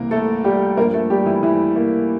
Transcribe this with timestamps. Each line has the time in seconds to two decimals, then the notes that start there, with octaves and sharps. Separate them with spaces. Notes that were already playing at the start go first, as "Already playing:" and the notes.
Already playing: C2 C3 E3 A#3 A#4
0.11 A3 A4
0.44 G3 G4
0.77 G2 A#3 A#4
0.80 F3
0.94 A3 A4
1.10 G3 G4
1.26 E3 E4
1.43 E3 E4
1.76 A#3